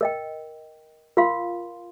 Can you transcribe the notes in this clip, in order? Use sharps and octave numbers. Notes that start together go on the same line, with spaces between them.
A#4 D#5 G5
F4 A#4 F5 C6